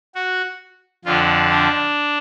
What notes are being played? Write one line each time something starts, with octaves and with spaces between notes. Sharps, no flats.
F#4
F2 D3 F3 F4
D4